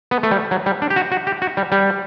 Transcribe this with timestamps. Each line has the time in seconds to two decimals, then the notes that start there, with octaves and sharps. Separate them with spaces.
0.11 B3
0.23 A3
0.31 G3
0.51 F#3
0.66 G3
0.82 D4
0.90 G4
0.96 F#4
1.12 F#4
1.27 G4
1.42 F#4
1.57 G3
1.72 G3